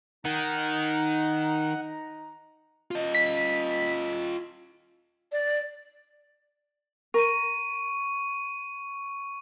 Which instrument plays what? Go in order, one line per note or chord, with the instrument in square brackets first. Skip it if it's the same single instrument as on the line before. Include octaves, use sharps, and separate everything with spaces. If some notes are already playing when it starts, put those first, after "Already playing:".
[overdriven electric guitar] D#3 [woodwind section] D#4 A#5 [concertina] F#5
[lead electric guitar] F4 D#5
[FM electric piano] B6
[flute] D5
[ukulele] A#4 [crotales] C#6 D#7